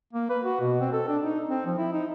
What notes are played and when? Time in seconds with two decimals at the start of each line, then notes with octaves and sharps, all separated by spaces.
0.13 A#3
0.30 B4
0.44 F#4
0.60 B2
0.81 C4
0.93 A4
1.08 D4
1.23 D#4
1.50 C4
1.66 F3
1.78 E4
1.93 D#4